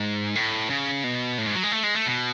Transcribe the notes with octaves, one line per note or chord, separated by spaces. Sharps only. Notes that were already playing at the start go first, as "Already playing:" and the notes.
Already playing: G#2
A2
C#3
B2
A2
G#2
F#3
G#3
A3
G#3
A3
B2